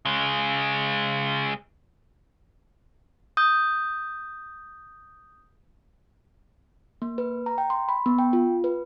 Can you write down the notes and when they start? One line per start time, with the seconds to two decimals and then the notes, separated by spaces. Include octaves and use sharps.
0.05 C#3 G#3
3.37 D#6 G6
7.02 A#3
7.18 B4
7.46 A#5
7.58 G5
7.70 C6
7.89 B5
8.06 B3
8.19 G5
8.33 F4
8.64 B4